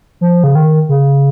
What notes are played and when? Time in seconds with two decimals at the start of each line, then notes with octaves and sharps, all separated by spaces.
0.21 F3
0.44 C#3
0.55 D#3
0.89 C#3